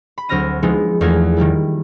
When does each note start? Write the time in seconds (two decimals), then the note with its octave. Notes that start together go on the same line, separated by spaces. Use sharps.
0.18 B5
0.29 D2 F#3 C4 F6 A#6 D#7
0.63 F3 G#3 B3 D#4 E4
1.01 E2 A3 F4 G#4 A#4 G#6
1.37 D#3 G3 A#3 E4